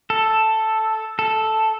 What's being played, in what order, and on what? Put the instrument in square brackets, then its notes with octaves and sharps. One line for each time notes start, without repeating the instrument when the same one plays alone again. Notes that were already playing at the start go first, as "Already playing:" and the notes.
[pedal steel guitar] A4
A4